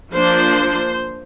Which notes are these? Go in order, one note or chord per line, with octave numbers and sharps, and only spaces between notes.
F3 A#3 D4 C5